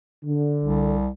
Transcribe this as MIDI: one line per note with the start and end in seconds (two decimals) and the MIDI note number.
0.23 0.95 50
0.63 1.07 36